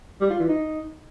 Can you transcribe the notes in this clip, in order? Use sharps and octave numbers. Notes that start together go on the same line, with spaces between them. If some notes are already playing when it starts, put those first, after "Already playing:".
G3
F4
E3
D#4